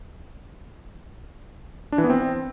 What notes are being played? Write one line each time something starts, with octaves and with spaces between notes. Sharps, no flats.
D4
E3
B3
C4